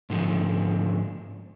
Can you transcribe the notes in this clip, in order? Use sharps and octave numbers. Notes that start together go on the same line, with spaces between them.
G#2 D3 F3